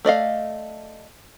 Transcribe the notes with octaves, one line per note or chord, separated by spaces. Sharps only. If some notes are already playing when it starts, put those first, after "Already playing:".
A3 D5 D#5 F5